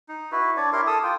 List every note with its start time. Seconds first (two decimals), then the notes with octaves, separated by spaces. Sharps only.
0.09 D#4
0.32 E4 F#4 B4
0.57 D4 C#5 D5
0.73 E4 G4 A#4 C6
0.87 A4 D#6 E6
1.03 F4 G5